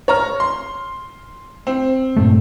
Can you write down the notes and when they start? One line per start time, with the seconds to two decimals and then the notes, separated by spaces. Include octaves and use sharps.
0.08 C#5 A#5 F6
0.40 C6
1.67 C4
2.17 G2 A#2 A3